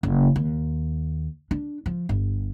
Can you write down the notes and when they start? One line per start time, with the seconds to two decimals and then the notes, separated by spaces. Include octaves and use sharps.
0.03 F#1
0.36 D#2
1.51 D4
1.86 F3
2.09 G1